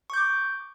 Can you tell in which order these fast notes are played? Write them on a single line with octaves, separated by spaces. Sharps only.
C#6 G6 D6